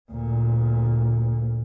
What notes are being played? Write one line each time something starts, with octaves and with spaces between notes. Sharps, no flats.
D2 A#2